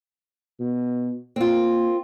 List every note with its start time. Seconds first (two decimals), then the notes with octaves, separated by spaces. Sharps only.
0.60 B2
1.36 A#3 C4 F4